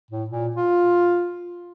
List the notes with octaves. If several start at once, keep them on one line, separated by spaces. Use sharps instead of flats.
A2
A#2
F4